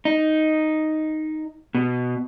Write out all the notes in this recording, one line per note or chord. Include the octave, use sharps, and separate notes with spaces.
D#4
B2